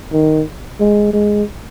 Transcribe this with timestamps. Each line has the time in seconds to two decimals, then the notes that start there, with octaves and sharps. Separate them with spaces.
0.13 D#3
0.80 G#3
1.13 G#3